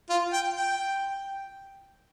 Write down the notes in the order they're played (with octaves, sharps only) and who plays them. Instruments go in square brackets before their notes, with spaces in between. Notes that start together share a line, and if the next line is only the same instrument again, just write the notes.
[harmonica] F4
G5
G5